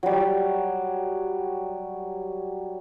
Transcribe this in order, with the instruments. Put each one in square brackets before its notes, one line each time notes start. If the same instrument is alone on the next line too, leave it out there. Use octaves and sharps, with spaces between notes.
[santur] F#3 G3